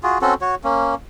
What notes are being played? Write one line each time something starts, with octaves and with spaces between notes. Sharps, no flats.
F4 F#4 G#4
C4 C#4 F#4 A4
F#4 C#5
A#3 C#4